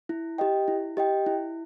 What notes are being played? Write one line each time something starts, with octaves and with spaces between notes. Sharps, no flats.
E4
G4 D#5 G5
E4
G4 D#5 G5
E4